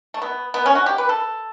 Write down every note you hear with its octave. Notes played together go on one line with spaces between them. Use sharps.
A3
B3
B3
C#4
F#4
G4
B4
A4